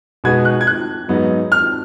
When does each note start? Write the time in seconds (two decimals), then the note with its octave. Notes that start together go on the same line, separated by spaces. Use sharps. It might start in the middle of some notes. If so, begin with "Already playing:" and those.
0.24 B2 G#3 D#4 F#4 B4 G#6
0.45 F#6
0.61 G#6
0.67 F#6
1.09 G#2 F#3 B3 D#4
1.52 F6